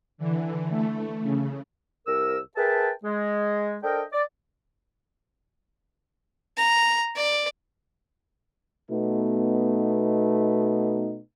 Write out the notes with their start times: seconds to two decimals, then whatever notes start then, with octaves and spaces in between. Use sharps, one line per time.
0.18 D3 E3
0.70 A3
1.22 C#3
2.07 C2 A#4 E6
2.57 G#4 A#4 B4 E5 G5 A5
3.04 G#3
3.84 D4 A4 A#4 C5 D#5 G5
4.13 D5
6.57 A#5
7.16 D5
8.90 B2 A3 B3 D#4